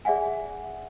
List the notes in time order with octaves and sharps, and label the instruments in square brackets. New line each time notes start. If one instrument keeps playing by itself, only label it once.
[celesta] G#4 D5 E5 F#5 G#5